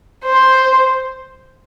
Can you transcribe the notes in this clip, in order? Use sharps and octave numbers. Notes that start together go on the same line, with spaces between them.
C5